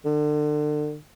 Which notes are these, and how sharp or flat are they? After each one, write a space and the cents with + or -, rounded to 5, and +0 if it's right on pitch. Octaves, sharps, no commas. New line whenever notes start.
D3 +30